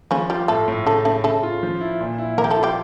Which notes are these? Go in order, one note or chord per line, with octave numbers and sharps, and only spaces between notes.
C#3 F3 C#4
G3 F4 G4
A2 A3 A4
A2
C#3 A3 A4
C#3 A3 A4
C#3 A3 A4
F4
F3
E4
A#2
E4
F3 A#3 A#4
G4
A3 A4
F4
G3 G4